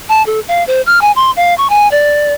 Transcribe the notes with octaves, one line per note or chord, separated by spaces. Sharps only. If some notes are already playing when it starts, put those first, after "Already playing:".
A5
A4
F5
C5
F6
G#5
C6
F5
C#6
G#5
D5